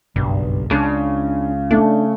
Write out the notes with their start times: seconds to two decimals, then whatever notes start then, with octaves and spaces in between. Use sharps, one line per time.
0.16 F#1 B1 G2
0.71 C#2 C#3 D4
1.71 A3 D4